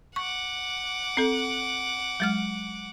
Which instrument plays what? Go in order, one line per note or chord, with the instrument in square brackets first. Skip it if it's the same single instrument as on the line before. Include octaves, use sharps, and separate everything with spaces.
[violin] F#5 D6 [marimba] C#6
[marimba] C4 A4
F#3 G#3 F6